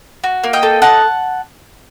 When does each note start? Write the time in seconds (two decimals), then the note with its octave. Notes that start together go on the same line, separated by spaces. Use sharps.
0.24 F#4
0.44 A#3
0.53 D#5 G5
0.63 A4
0.82 D#4 F#5 A5